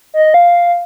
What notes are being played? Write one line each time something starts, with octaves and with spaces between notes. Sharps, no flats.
D#5
F5